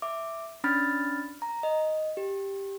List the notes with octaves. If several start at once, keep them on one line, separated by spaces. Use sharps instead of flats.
E5 D6
C#4 D4 B5 F6 A6
A#5
D#5
G4